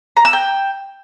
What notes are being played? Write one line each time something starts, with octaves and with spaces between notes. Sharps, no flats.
A#5
E6
G5